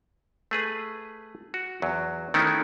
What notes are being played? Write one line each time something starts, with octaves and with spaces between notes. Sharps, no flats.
A3 G#4 B4
F#4
E2 F#3
D#3 A3 B3 C#4 D#4 E4